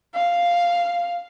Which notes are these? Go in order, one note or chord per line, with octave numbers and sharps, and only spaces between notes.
F5